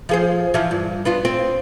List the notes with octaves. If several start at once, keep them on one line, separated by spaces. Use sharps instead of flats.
F3 G#4 C5
E3 F3
G2
B3 D4 F4
C4